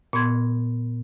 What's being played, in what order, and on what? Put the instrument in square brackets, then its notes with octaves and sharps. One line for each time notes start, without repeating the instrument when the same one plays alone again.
[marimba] A#2 B3 C6 G#6